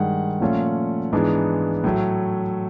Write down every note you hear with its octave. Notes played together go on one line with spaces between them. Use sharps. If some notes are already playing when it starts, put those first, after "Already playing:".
Already playing: G2 D#3 G#3 F#5
A#2 F3 A3 C#4 F4
G#2 E3 G#3 B3 D4
A2 F#3 A3